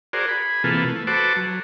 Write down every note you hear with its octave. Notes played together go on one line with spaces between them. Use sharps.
F#4 G#4 A#4 C5 D5
G#4 B5
C3 E3 A#3 F4 A4 B4
A3
F#4 A4 B4 C5 A5 D6
F#3